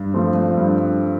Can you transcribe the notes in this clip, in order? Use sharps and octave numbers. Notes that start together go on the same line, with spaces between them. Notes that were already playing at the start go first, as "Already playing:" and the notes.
Already playing: G2
F3 A3 C4
G2